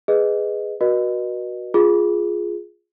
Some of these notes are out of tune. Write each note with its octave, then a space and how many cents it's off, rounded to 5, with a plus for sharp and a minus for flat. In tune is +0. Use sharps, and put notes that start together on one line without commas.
G#4 +0 B4 +15 D#5 +0
F#4 +0 B4 -40 D#5 -25
F4 +0 G#4 +0